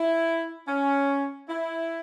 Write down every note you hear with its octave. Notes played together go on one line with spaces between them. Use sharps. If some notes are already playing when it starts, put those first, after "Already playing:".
Already playing: E4
C#4
E4